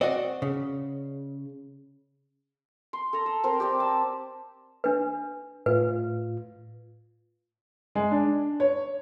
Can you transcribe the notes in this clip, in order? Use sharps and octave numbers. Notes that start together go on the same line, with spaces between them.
C4 F#4 D5 D#5 F#5
C#3
C6
A4 A5 A#5
E6
C4 A#4 C5
G4 D5 G5
A5 E6
D4 B4
A2 F4 B4
G#3
D4
C#5